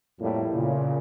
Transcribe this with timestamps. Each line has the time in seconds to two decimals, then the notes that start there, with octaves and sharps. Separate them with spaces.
0.20 F2 A2 G3 A#3
0.53 A#2 C#3